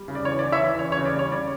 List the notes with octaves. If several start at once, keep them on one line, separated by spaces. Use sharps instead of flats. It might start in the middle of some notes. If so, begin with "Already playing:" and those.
Already playing: G3
C#3
D5
E3 C#5
D5
E3
C#5 E5
E3
C#3 C#5
C#5
C#3
D5
G3 C#5
C#3 D5